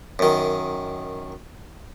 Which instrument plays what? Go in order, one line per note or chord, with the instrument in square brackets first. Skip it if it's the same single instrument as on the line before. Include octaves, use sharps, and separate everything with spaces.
[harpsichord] F#2 D#3